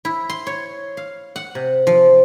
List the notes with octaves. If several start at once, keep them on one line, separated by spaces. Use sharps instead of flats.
E4
C6
C#5
F5
F#5
C3
F3